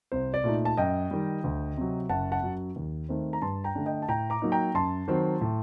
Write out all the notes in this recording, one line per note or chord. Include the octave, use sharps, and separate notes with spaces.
C2 C5
D5
A#2 A3 D#4
A5
F#2 D#5 G5
D#3 G3
D2
C3 F#3
F#1 F#5 A5
F#5 A5
F#2 F#3
D#2
D#3 A3 C4
A#5
G2 A5 C6
G5 A#5
D3 A3 D4
D#5 G5
A5
A2 G5 A#5
A#5 D6
F#3 A#3 D#4
G5 A#5
F#2 A5 C6
D#3 F#3 C4
A2